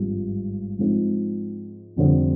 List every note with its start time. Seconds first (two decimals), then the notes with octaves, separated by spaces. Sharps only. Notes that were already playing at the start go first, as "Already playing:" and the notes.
Already playing: G#1 G2 F3 G#3
0.79 G#2 F3 C4 D#4
1.96 F1 F2 D3 G3 C4